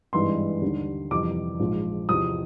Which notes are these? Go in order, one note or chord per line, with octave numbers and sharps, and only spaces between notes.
G#1 G2 E3 G#3 C6
D#2 D3 G3
F2 C3 E3 G3 D6
A#1 G#2 F3 G#3
E2 C3 F3 D#6